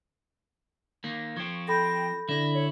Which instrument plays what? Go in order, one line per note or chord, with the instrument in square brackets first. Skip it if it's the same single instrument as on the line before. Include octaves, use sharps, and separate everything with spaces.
[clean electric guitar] D#3 A#3
[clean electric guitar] F3 C4 [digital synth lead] C#6 [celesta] G#6
[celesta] A4 B5 G6 [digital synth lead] G5 [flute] A#6
[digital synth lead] D3 [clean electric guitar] E4 [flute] A#6
[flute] C#5